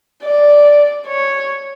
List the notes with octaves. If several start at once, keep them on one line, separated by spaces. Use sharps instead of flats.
D5
C#5